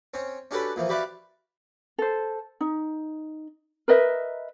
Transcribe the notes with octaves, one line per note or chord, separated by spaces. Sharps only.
C4 C#4
C#4 D4 F#4 G4 A4 B4
A#2 E3 F3
F#4 G4 B4 D5 E5 F5
A4 C5
D#4
A#4 B4 D#5 E5